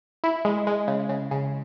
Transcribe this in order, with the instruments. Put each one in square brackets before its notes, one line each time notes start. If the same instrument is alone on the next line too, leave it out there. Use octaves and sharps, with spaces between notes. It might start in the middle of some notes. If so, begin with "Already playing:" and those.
[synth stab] E4
G#3
G#3
C#3
C#3
C#3